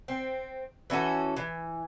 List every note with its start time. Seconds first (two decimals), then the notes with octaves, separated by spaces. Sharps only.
0.08 C4
0.90 E3 C#4 F#4 A4
1.36 E3